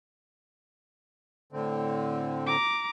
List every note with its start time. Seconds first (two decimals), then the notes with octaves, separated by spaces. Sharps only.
1.52 A2 D3 C4
2.47 A#5 D6